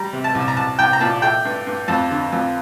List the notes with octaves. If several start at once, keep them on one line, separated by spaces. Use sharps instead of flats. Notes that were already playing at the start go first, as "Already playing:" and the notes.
Already playing: G3 A#5
C3
A5
C2
A#5
C2 A5
C2 G5
A#5
A#2 A5
A3 G5
G2
G2
F2 A5
D3
F2